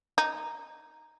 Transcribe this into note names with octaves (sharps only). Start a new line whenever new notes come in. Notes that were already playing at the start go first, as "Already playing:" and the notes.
D#4